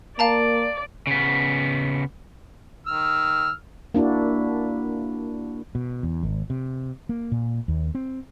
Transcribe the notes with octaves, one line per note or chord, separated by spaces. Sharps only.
A#3 D5 F5 A5 A#5
C#3 B3
D#3 E6 F6
A#3 D4 E4 F#4
B2
E2
G#1
C3
A#3
A#2
D#2
C4